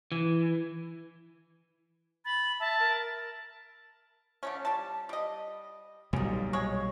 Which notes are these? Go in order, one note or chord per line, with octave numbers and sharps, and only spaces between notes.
E3
B5 A6
E5 A5
A#4
D3 A3 C#4
G3 A5
G3 D#5
B1 A#2 G3 C#4 D#4
G#3 C#5